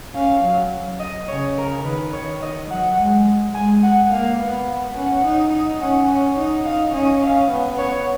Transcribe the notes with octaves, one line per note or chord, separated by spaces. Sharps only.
C#4 F5
F#3
D#5
C#3 C#5
A#4
D#3 B4
C#5
D#5
F#3 F#5
G#3
G#3 G#5
F#5
A#3 F5
B3
C#4 F#5
D#4
D#4
C#4 F#5
F#5
D#4
D#4 F5
C#4 D#5
F5
B3
C#5